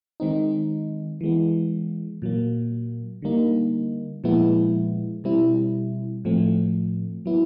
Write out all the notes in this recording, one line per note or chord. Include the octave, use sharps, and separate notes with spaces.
D#3 G#3 C4 D#4
E3 G#3 B3
A#2 F#3 A#3
D3 G3 A#3 D#4
A#2 F3 G#3 B3 E4
B2 G3 C4 E4
A2 F3 A3 C4
F#3 B3 E4